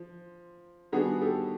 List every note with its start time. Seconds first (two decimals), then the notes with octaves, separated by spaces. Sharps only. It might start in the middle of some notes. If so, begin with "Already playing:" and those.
Already playing: F3
0.92 D#3 G3 B3 D4 F#4 G#4
1.21 G4 A4